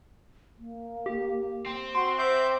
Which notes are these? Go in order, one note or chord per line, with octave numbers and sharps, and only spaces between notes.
A#3
G4
C4
F#4 C6
C5 E5 D6 G6